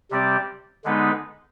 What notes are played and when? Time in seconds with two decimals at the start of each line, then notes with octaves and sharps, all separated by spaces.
0.11 C3 G3 C4 G4 D5
0.84 D3 G#3 B3 D#4 B4